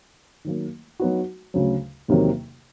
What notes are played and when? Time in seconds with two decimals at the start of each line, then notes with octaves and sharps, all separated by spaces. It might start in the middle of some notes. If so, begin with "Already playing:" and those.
0.45 D#3 F#3 A#3
1.00 F#3 B3 D#4 F#4
1.54 D2 C#3 F#3
2.08 E2 C3 D#3 F#3 A#3